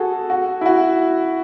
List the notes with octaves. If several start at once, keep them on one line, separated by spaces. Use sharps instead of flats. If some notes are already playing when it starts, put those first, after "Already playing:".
Already playing: F#4 G#4 A4
F#4
E4
F#4